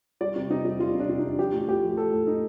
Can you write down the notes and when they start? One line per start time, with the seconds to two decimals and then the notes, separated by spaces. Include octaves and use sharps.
0.21 G3 D5
0.36 C3
0.50 C3 D#4
0.65 G3
0.80 G3 F4
0.95 C3
1.00 D4
1.09 C3
1.19 D#4
1.24 G3
1.38 F3 G4
1.53 A2
1.68 A2 G4
1.83 F3
1.97 F3 A4
2.12 A2
2.27 A2 D#4